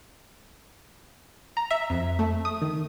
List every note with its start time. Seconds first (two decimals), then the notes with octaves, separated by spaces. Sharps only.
1.57 A#5
1.71 E5
1.90 F2
2.19 A3
2.45 D#6
2.62 D#3